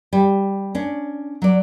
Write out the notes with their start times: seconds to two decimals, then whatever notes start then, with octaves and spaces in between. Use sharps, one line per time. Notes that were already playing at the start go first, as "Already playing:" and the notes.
0.13 G3
0.75 C#4 D4
1.42 F#3 D5